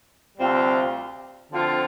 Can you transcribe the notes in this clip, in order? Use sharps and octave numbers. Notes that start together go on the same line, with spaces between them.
D2 C3 G3 C4 F4
D3 F3 C4 F4